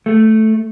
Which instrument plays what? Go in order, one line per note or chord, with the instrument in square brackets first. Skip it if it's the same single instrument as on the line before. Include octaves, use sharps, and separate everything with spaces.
[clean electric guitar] A3